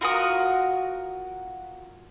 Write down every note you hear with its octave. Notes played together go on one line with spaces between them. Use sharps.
F4 F#4 A#4 D#6